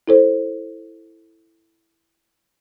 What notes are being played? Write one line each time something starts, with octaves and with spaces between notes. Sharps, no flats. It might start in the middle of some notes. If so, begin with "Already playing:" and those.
E4 A4 C5